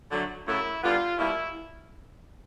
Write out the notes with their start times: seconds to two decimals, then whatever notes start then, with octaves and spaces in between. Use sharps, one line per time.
0.11 D3 F#3 A3
0.46 F#2 C#3 F#3 A3 E4
0.82 D3 G3 B3 F4
1.18 B2 G3 A#3 E4